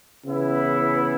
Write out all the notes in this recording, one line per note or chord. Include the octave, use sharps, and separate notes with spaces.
C#3 E3 B3 E4